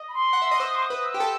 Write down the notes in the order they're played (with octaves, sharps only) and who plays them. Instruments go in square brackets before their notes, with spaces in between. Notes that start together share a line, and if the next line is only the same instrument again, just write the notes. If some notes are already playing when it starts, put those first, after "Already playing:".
Already playing: [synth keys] D#5
[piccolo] B5
C6
[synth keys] F#5
E5
D#5
[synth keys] C5 [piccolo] E6
[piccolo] D#6
C6
D#6
[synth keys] B4
[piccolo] E6
[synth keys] G4
A4